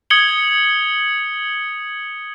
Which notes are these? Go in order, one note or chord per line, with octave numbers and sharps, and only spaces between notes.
D#6 G#6 C#7 F#7 G7